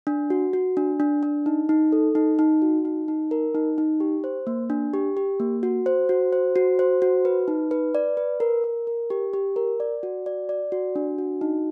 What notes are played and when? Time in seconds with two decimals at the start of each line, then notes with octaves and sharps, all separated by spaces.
0.07 D4
0.30 F#4
0.53 F#4
0.77 D4
1.00 D4
1.23 D4
1.46 D#4
1.69 D#4
1.92 A4
2.15 D#4
2.39 D#4
2.62 F#4
2.85 D#4
3.08 D#4
3.31 A#4
3.55 D#4
3.78 D#4
4.00 G4
4.24 C5
4.47 A#3
4.70 D4
4.94 G4
5.17 G4
5.40 A#3
5.63 F#4
5.86 C5
6.09 F#4
6.33 C5
6.56 F#4
6.79 C5
7.02 F#4
7.25 B4
7.48 D#4
7.71 B4
7.95 D5
8.17 B4
8.40 A#4
8.64 A#4
8.87 A#4
9.10 G4
9.33 G4
9.56 A#4
9.80 D5
10.03 F#4
10.26 D5
10.49 D5
10.72 F#4
10.96 D4
11.18 F#4
11.41 D#4